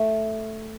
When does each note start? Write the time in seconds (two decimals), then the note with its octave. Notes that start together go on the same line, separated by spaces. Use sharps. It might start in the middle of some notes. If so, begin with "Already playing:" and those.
Already playing: A3